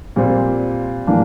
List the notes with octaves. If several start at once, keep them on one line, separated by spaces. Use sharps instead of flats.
A#2 G3 C4
A2 E3 G3 A#3 D4